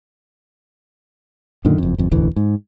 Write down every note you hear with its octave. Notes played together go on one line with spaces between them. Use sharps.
F#2 A#2 D3 D#3
F#1 F2
G1 F2
E1 A1 D2 E3
G#2